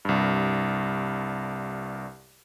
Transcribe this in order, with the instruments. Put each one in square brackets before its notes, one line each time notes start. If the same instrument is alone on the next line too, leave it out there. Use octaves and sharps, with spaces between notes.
[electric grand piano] C2 G2